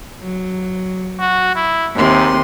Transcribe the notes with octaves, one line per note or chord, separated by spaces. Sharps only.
F#3
F#4
E4
D#2 G#2 C3 C6